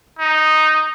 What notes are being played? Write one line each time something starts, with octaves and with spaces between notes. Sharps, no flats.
D#4